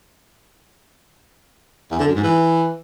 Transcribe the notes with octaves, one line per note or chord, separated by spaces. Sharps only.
E2
D3
F#2
G#2
E3